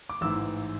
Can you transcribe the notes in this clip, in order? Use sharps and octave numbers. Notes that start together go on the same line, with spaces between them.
D6
A1 G#2 E3 E6